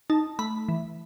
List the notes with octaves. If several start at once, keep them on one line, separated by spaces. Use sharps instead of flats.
D#4 A5
A3 B5
E3